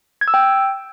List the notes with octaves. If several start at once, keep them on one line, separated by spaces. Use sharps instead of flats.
G#6
E6
G5